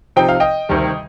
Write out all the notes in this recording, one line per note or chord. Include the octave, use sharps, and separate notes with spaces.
C3 F3 C4 D#4 G5
F5
D#5 G5
D2 C3 D#3 G3